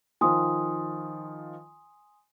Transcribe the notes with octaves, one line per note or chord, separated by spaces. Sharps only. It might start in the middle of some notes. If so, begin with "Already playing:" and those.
D#3 F3 G#5 C6 D#6